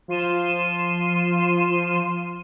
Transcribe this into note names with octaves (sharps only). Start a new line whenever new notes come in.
F3 F4 C6 D#7 E7